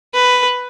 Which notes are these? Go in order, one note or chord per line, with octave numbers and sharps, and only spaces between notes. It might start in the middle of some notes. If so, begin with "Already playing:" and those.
B4